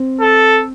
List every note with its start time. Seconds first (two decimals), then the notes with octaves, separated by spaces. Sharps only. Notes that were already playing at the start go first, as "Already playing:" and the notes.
Already playing: C4
0.21 A4